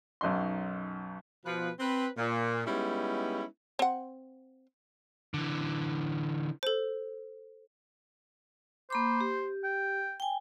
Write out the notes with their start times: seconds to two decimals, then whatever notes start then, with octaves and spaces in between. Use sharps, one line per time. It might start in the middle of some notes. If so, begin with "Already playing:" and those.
0.21 B1 F#2 D#4 C6
1.45 B2 F3 B4
1.80 C4 B4
2.17 A#2
2.67 G3 G#3 B3 C#4 D#4 E4
3.79 C4 F#5
5.34 D3 E3
6.63 A4 C5
8.90 A#3 C5 B5 D6
9.20 G4
9.64 G5
10.20 G5 G#5